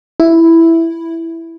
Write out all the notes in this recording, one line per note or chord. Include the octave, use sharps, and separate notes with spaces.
E4